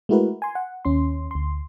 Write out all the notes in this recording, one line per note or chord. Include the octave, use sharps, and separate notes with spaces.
G#3 A3 E4 F#4 A#4 B4
G#5 C6
F#5
D#2 C#4 C6
D2 C6